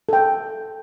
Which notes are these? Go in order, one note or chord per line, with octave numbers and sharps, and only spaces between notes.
A4 G5